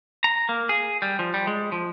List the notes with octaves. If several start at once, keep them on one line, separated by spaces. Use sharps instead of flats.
A#5
A#3
G#4
G3
F3
G3
G#3
F3